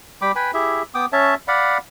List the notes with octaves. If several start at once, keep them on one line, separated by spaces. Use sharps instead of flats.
G3 G5 B5 D6
B4 G5 G#5 B5
E4 G4 G#4 E5
B3 G5 D6 D#6
C#4 C#5 E5 A5
D5 F5 F#5 B5